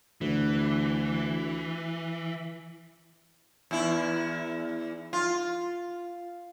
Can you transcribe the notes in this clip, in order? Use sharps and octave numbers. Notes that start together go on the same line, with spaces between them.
D2 E3
E2 E4
F4